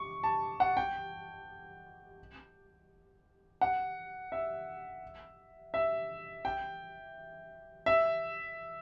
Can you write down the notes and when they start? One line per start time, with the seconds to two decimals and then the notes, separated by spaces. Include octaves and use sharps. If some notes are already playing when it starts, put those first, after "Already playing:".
Already playing: C#6
0.24 A5
0.60 F#5
0.77 G5
3.61 F#5
4.32 E5
5.74 E5
6.45 G5
7.86 E5